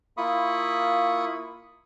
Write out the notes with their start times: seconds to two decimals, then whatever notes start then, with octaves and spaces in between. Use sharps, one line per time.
0.17 A#3 E4 F4 B5 C#6 D#6